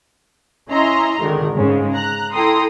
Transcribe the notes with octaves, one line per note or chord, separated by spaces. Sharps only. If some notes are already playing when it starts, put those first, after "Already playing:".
C#4 E4 D#5 E5 A#5 C6
G#1 D3 D#3 A#4
G#2 C#3 G#3
A#5 F#6
E4 A4 G5 A#5 C6 D#6